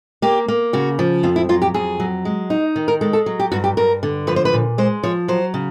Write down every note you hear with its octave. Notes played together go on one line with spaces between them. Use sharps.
A#3 G4
A#3
C#3 F#4
F3
F2 F4
E4
F#3 F4
G4
F2 G#4
F#3
G#3
D#4
D#3
A#4
G#3 A4
A4
F#3
G4
G2 F#4
G4
G2 A#4
D3
F3 B4
C5
B4
A#2
G#3 C5
F3 C#5
F#3 C5
C#3